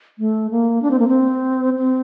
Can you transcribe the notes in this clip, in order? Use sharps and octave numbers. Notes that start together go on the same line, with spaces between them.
A3
A#3
D4
C4
A#3
C4
C4